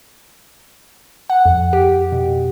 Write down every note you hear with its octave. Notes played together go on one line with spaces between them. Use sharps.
F#5
F2
G4
B2